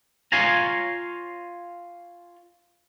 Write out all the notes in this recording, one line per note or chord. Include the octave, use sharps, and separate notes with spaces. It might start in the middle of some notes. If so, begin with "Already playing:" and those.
F4 C#5 F5 G#5 A#5